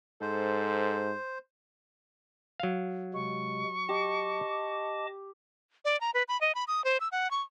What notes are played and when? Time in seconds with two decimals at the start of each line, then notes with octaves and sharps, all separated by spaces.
0.21 G#2 A4 C5
2.60 F#3 F5
3.14 C3 G#3 C#6
3.89 G4 D#5 A5 D6
5.85 D5
6.01 A#5
6.14 B4
6.28 B5
6.41 D#5
6.55 B5
6.68 D#6
6.84 C5
7.00 E6
7.12 F#5
7.31 C#6